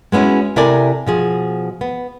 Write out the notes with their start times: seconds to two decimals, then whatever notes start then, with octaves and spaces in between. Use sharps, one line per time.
0.12 G#3 B3 C#4 E4 F#4
0.56 C3 E4 A4 A#4 D5 G#5
1.07 B2 F3 G#4
1.81 B3